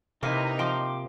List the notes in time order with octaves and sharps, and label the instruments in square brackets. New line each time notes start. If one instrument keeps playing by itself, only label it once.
[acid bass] C3 [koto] A#3 [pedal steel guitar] C4 E4 B4 [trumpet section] D#4
[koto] F3 [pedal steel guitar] G5 C6 D6